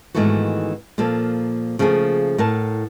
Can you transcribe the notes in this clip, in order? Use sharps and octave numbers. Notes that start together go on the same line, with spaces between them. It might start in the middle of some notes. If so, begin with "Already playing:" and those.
G#2 D#3 E3 A3 B3 F#4
A#2 F3 A#3 A4
C#3 F3 A3 A#3 G#4
A2 A#4 F#5 A5